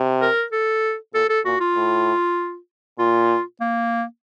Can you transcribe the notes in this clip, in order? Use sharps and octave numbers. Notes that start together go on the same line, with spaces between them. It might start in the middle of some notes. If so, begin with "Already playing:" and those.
Already playing: C3
A#4
A4
A#2 A4
A4
A#2 F#4
F4
A2
A#2 F4
A#3